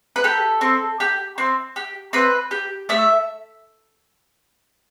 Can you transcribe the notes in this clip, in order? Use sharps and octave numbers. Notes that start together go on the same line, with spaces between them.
B4
G4 A4
C4
G4
C4
G4
C4 B4
G4
A3 E5